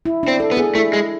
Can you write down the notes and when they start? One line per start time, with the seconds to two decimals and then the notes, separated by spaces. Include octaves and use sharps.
0.06 E4
0.23 D4
0.28 C4
0.40 A4
0.51 B3
0.57 G#4
0.75 A3 E4
0.93 G#3